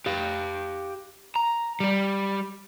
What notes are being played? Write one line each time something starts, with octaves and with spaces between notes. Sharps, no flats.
G4 F5
A#5
G3 G4